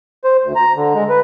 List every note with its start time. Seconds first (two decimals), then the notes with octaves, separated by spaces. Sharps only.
0.24 C5
0.44 D2
0.56 A#5
0.76 D3
0.94 G#3
1.09 B4